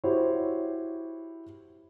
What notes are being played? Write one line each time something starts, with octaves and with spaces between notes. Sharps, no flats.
E4 F#4 G4 C5 C#5